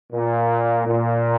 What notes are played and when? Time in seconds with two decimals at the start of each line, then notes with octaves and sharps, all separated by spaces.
0.12 A#2
0.85 A#2